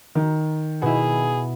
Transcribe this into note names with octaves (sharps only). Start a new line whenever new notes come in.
D#3
B2 E4 G#4